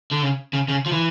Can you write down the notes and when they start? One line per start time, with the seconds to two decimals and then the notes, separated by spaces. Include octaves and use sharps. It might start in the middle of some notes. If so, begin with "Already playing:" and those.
0.11 D3
0.22 C#3
0.53 C#3
0.68 C#3
0.86 F3
0.92 E3